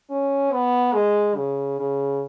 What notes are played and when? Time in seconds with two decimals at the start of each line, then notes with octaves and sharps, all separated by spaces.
0.11 C#4
0.53 B3
0.94 G#3
1.36 C#3
1.79 C#3